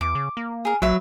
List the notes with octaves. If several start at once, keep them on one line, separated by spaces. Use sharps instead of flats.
E2 D6
C#3
A#3
G#4 A#4
A#1 F#3 B4 E5